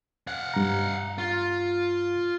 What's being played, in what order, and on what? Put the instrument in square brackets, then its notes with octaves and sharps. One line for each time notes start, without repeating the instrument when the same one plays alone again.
[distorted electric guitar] F5 F#5
[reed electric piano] G2 A#5
[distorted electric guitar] F4